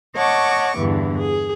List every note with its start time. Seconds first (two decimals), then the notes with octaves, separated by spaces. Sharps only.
0.14 C#5 D#5 F#5 A5 C#6 D6
0.76 E2 G2 D3 E3
1.17 G#4